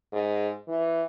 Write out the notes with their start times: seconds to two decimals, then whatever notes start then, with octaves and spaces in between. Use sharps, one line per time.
0.13 G#2
0.68 E3